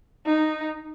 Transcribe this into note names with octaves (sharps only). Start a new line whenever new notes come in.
D#4